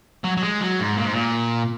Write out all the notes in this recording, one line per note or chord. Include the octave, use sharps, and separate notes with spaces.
F#3
F#3
G#3
F#3
G#2
A#2
G#2
A#2